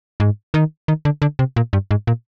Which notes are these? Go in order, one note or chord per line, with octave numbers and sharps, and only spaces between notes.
G#2
D#3
D#3
D3
D3
C3
A#2
G2
G#2
A#2